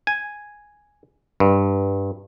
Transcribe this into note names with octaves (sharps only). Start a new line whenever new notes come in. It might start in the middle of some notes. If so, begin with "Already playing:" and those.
G#5
G2